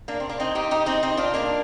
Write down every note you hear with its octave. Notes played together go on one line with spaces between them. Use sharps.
A#3 D4
C4
A#3 D4
C4 D#4
D#4 G4
D#4 G4
C4 D#4
C4 D#4
D4 F4
A#3 D4